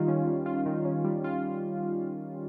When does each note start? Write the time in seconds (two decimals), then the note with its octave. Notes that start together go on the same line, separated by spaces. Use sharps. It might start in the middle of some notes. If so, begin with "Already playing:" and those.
Already playing: D#3 G3 F4
0.08 C#4
0.27 G3
0.46 F4
0.66 D#3
0.85 C#4
1.04 G3
1.24 F4